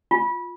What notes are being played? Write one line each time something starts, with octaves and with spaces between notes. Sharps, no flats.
F4